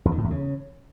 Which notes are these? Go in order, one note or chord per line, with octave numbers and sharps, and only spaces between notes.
E2
D#3
A2
E2
C#3